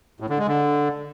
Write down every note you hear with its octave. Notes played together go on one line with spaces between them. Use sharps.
A2
D3
G#3
D3